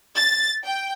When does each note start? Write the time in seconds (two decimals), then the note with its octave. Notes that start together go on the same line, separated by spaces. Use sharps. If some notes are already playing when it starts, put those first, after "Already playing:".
0.16 A6
0.64 G5